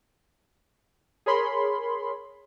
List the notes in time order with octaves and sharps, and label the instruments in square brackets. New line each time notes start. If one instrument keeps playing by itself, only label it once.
[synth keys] G#4 A#4 C#5 B5 C6